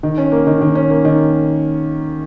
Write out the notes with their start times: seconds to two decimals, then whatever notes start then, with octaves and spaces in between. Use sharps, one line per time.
0.03 D#3
0.18 C#4
0.32 A#3
0.47 D#3
0.61 D#3
0.75 C#4
0.90 A#3
1.05 D#3